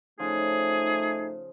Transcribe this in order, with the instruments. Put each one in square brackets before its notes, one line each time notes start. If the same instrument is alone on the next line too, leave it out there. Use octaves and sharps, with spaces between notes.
[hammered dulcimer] C#3 F3 [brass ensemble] A3 D#4 [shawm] G#4